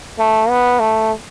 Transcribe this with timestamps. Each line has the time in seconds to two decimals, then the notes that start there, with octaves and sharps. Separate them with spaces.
0.19 A3
0.50 B3
0.80 A3